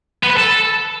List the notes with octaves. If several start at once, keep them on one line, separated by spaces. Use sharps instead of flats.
B3
B4
A4